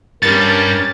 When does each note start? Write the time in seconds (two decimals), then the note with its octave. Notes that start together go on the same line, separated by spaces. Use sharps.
0.23 G2 C#4 G4 A#4 A6